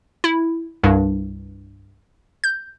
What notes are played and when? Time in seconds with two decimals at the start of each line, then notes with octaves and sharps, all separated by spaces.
0.24 E4
0.83 C2 G2
2.44 G6